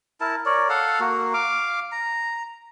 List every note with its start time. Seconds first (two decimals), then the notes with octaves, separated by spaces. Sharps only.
0.21 E4 A#4 A5
0.46 A#4 C#5 D5
0.69 A4 F5 F#5
1.00 A#3 F#4
1.34 F5 D6
1.92 A#5